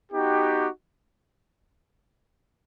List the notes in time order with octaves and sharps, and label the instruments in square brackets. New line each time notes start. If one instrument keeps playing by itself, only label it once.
[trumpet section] B3 D#4 F#4 G4